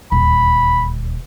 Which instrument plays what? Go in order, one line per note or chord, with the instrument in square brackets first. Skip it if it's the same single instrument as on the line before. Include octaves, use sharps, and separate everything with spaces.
[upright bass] D#1 D2 [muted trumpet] B5